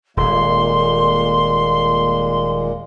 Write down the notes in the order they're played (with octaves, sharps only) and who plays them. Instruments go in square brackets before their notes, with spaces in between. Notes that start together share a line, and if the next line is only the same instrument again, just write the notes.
[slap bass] D#1 [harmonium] A#2 G#3 A#3 [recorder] C6